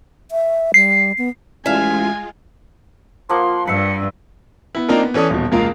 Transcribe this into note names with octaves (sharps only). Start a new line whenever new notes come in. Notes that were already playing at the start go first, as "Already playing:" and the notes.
E5
G3 C7
B3
A1 G#3 F4 E5 F5 G#5
F3 A#3 F#5 C6
G2 B4 E5 C#7
B3 E4
A#3 C4 D4 D#4 F4 A#4
B3
E3 C#4 A4 D5 D#6
D#1 B2
E1 C#2 A#3 F4 A#4 F5